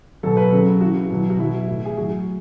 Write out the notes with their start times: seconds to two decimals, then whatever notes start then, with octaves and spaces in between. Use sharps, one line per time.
0.23 B2 F#3 A4
0.37 B4
0.50 C#3 F#3 A4
0.81 C#3 E3 F#4
1.10 B2 F#3
1.30 F#4
1.39 B2 F#3 E4
1.68 A2 E3
1.86 G#4
1.97 A2 F#3 F#4